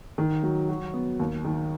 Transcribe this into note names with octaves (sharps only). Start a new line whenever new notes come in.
D#3
F#3
F#4
B3
D#2
D#3